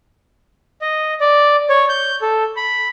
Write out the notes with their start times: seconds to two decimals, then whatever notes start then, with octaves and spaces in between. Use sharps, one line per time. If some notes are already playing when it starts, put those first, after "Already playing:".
0.82 D#5
1.21 D5
1.69 C#5
1.89 G6
2.22 A4
2.56 B5